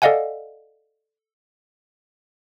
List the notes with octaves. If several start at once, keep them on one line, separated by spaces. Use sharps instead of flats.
A4 D5 D#5 F5 F#5 G#5